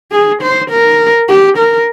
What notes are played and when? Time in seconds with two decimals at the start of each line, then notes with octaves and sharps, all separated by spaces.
0.12 G#4
0.42 C5
0.70 A#4
1.28 G4
1.57 A#4